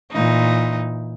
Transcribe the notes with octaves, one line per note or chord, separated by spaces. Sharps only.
A#2 E3 D#4